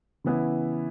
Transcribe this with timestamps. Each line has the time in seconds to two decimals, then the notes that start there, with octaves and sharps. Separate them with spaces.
0.24 C#3 E3 B3 E4